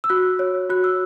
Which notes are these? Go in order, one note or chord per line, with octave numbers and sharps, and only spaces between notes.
E6
F#4 F#6
C#5
F#4 F#6
E6